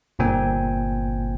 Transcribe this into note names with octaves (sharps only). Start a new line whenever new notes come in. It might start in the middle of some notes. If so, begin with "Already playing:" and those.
G1 A#2 C4 G5 G#5